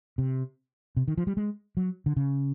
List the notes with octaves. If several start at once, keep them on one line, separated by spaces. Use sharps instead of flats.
C3
C3
D#3
F3
G3
G#3
F#3
D3
C#3